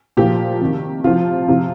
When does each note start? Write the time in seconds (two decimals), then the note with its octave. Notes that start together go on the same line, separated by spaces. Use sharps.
0.17 A#2 F3 G4
0.61 C3 D#3
1.04 C3 F3 F4
1.48 C3 F3